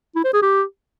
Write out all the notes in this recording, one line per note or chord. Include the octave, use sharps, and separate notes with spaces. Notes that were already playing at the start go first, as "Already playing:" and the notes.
E4
C5
G#4
G4